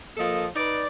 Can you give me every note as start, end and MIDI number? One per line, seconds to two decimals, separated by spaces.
0.16 0.45 53
0.16 0.45 58
0.16 0.45 69
0.16 0.45 75
0.56 0.86 63
0.56 0.86 71
0.56 0.86 74